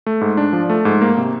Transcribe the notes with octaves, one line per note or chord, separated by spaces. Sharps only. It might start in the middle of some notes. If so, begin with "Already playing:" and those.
A3
G#2
D4
F3
A3
G#2
A#3
C3